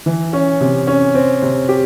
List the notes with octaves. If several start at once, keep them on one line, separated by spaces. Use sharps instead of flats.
E3
C#4
C3
C#4
C4
C3
G4